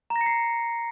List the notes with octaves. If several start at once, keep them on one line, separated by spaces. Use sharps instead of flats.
A#5
A#6
C#7
C7